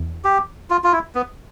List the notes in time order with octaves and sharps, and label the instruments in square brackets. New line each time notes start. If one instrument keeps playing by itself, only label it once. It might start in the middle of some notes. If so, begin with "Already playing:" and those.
Already playing: [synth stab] E2
[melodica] G4
F4
F4
E4
B3